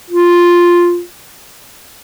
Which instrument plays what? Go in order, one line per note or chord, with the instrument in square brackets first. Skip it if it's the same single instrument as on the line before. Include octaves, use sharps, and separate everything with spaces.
[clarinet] F4